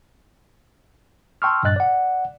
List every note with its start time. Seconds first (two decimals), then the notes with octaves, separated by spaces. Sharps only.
1.42 G5 A5 C6 C#6 E6 F6
1.63 G2 A#2 D#5 F#6 A6
1.76 D5 F#5